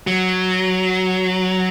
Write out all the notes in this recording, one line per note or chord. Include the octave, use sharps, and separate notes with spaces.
F#3